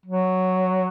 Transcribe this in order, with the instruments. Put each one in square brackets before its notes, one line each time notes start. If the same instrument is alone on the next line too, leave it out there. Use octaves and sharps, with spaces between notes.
[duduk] F#3